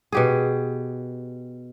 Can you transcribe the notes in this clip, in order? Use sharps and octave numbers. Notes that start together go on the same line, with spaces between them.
B2 G4 G#4